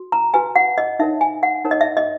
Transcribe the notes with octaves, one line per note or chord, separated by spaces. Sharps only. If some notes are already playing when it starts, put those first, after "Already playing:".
Already playing: F#4
A#5
F#4 B4 G#5
F#5
D#5
D#4 A#4 C#5 E5
G#5
F#5
D#4 A#4 C#5
D#5
E5
D#5